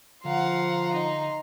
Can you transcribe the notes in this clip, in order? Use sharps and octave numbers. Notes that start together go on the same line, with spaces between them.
D3 F3 F5 F#5 A#5 C6
D#4